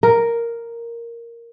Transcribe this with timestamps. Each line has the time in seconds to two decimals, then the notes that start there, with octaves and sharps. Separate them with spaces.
0.03 A#4